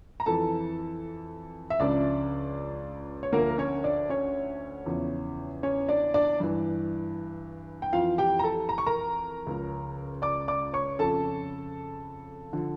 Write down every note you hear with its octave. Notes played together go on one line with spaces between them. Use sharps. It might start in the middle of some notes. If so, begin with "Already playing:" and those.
A#5
F2 E3 A4 A5
E5
C#2 C#3 F3 D4 D5
C#5
D2 D3 F3 A#3 A#4
A#4
C#4 C#5
D4 D5
C#4 C#5
E2 C#3 F3
C#4 C#5
D4 D5
D4 D5
G2 E3
G5
F2 E3 F4 F5
G4 G5
A#5
A4 A5
A#5
C#6
A#4 A#5
C#2 C#3 F3
D5 D6
D5 D6
C#5 C#6
F2 C#3 F3 A4 A5
D3 F3